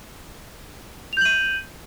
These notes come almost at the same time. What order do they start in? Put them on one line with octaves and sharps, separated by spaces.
F7 G6 F#7 D#7